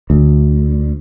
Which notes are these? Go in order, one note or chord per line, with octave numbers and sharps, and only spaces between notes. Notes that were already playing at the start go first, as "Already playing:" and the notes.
D2